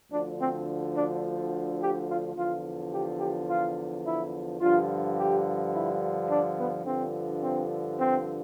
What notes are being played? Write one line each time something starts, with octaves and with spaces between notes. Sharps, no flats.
D2 D3 F3 D4
C4
D4
G4
F4
E2 D3 F3 F4
G4
G4
F4
E4
G2 D3 F3 F4
G4
E4
D4
B3
G2 D3 F3 C4
C4
C4